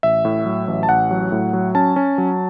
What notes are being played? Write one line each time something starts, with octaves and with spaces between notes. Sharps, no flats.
A1 E5
A2
F#3
A1
A5
A1 F#5
F#3
A2
F#3
C#4 A5
C#4
F#3